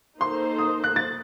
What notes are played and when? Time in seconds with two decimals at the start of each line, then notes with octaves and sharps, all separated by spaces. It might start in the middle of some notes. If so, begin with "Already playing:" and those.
0.20 A#3 D#4 A4 C5 C6
0.58 D#6
0.84 F#6
0.96 A6